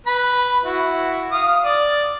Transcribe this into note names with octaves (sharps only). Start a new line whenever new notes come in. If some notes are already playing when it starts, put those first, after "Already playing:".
B4 B5
E4 F#4
F5 D#6
D5